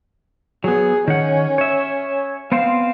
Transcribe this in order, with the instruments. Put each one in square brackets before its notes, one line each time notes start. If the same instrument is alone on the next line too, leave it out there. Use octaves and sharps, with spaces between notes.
[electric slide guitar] F#3 B3 [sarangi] G#4
[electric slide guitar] D#3 F#5 [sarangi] C#4
[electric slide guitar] C#5 E5
[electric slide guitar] B3 C4 C5 [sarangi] F5